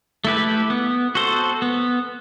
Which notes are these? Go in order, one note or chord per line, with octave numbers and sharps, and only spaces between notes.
A3 E4 G4 B4
B3
F#4 A4 C5
B3